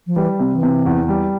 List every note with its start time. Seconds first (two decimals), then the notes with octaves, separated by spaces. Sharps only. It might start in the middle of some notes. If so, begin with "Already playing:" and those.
0.07 F3
0.16 E3 G3
0.39 C3
0.51 E3
0.63 C3
0.86 E2
1.08 G3